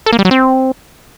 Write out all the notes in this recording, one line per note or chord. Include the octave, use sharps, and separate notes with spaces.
A4
A#3
G3
F#3
C4